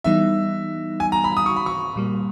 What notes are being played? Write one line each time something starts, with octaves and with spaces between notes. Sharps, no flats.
E3 G3 B3 D#4 E5
G#5
A#5
B5
D#6
C#6
B5
C#6
A#2 G3 A#3